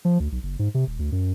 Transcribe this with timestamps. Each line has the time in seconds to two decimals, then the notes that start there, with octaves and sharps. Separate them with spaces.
0.05 F3
0.20 D2
0.32 B1
0.43 F#1
0.59 G#2
0.74 C3
0.87 D#1
0.99 D2
1.12 F#2